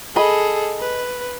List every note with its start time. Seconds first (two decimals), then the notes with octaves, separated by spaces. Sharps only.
0.16 G#4 A4 D#5 B5
0.80 B4